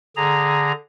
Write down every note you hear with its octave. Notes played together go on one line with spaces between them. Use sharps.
D3 G#4 A#5